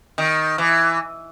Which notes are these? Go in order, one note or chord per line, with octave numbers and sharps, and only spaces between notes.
D#3
E3